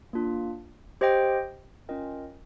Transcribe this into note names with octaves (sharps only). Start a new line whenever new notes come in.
A#3 D4 F4
G4 C5 D#5 G5
C#4 F4 A#4 D#5 G5